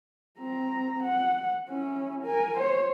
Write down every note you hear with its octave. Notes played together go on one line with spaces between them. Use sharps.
C4 A#5
F#5
C#4 E4
A#4 G#5
C5 C#5